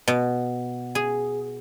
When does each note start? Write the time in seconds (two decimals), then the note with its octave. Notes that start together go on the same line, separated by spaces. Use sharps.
0.08 B2
0.95 G#4